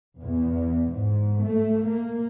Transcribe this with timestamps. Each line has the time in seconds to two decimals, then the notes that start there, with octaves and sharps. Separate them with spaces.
0.19 E2
0.88 G#2
1.40 A3
1.83 A#3